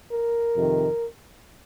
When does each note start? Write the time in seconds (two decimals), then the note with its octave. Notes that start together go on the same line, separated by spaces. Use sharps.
0.12 A#4
0.56 F2 C3 D#3